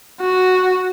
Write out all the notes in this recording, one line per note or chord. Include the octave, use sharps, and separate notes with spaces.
F#4